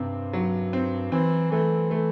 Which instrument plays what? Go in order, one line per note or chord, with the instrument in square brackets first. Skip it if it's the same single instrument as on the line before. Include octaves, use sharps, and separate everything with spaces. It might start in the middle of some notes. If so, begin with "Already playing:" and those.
Already playing: [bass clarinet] G2 [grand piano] C3 C4
[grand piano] F#3
C4
[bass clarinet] E3 [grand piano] C4
[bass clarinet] E3 [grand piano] A3
[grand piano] A3